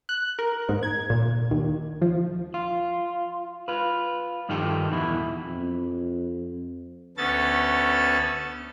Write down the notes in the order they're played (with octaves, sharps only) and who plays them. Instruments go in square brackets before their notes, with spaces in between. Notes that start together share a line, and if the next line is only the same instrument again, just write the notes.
[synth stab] F#6
A#4
G#2
G#6
A#2
D#2
F3
[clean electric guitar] F4
F4 B4
G2 D#3 F3 D#4 G4 A4
E2 B2 E3 E4
[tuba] F2
[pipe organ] D2 B3 C#4 A4 A6